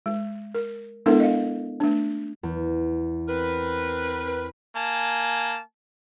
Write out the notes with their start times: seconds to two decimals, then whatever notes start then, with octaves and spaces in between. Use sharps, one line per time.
0.06 G#3
0.55 A#4
1.06 G#3 B3 D4 E4 A4 A#4
1.20 D#5 F5
1.80 A3 D4
2.43 E2
3.28 C4 A#4 B4
4.76 A#3 G#5 A5